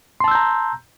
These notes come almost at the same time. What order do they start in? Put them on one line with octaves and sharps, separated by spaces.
C6 A5 E6 G6 A#5